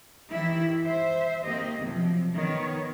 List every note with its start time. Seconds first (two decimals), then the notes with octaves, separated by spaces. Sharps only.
0.29 D#3 E3 E4 G4
0.85 C5 E5
1.43 D#3 A#3 C4 G4 D#5
1.82 C3 F3 F#3
2.33 D#3 B3 C#5